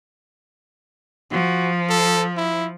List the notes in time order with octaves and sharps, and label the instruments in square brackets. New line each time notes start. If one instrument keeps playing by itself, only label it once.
[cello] F3 [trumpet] F#4
[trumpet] A4
E4